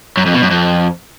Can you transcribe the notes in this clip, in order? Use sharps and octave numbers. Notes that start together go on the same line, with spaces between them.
F#2
F2
B2
F#2
F2